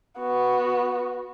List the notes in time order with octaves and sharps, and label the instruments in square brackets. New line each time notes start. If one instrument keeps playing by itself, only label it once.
[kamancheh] B3 F#4